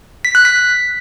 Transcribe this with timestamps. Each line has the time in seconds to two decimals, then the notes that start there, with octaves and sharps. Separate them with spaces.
0.25 B6
0.35 F#6
0.45 B6